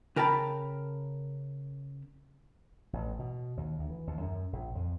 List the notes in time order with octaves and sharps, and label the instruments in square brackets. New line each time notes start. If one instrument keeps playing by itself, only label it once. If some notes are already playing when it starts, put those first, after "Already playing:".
[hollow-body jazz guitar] C#3 A#4 G5 A5 B5
[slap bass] A1
B2
D#2
D2
E3
D#2
F#2
A#1
F2